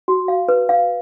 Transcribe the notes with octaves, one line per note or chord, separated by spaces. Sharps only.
F#4
F5
B4
F5